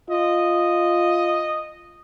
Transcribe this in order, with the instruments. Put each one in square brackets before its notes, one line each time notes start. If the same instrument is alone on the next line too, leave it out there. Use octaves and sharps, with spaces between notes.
[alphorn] F4 [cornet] D#5